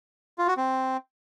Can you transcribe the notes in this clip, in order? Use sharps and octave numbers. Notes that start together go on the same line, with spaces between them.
F4
F#4
C4